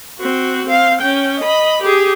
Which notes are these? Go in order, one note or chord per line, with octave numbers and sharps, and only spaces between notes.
C4 F#4
C4 F5
C#4 G5
D#5 B5
G4 G#4